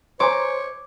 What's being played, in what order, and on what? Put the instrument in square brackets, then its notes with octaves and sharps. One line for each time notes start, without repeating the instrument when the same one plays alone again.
[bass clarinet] C5 [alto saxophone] C#5 [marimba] G#5 A#5 C6 [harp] D6